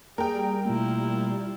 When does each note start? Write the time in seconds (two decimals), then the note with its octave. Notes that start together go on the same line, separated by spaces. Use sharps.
0.18 G3 A#3 G#4 A#4 G5
0.65 B2 A3 A#3 E4 F4